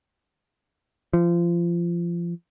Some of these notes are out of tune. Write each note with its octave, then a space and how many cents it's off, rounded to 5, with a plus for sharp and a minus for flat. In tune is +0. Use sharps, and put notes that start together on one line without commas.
F3 -25